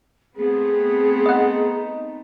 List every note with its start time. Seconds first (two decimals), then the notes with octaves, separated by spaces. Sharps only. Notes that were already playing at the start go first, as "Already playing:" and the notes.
0.36 A3 B3 C4 G#4
1.26 D#4 D#5 F#5